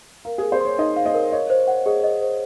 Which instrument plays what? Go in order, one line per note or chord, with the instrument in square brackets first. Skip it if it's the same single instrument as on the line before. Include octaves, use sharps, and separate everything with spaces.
[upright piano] A#4 [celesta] F5
[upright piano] G#4
[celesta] A#4
[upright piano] C5
[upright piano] C#5 [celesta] C6
[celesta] D#4 [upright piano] D#5
[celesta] F5
[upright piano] D#5
[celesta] A#4
[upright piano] C#5 [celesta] D#5
[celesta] C5
F#5
[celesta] G#4 [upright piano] D#5
[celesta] D#5
C5